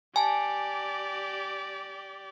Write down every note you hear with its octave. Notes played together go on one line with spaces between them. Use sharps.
G4 D5 G#5 A5